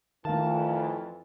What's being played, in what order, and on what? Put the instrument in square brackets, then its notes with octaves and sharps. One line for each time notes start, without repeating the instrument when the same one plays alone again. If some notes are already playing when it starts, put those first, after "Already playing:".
[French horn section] F2 E3 [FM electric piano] D#3 [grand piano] A3 F4 A#4 [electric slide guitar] A5